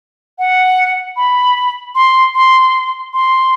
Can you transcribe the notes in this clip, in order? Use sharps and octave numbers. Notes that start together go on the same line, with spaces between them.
F#5
B5
C6
C6
C6